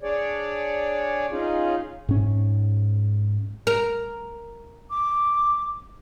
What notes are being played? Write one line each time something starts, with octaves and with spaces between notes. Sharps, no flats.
D4 G#4 C#5 D5
C#4 D#4 F4 G#4
G#2 C#4
A#4
D6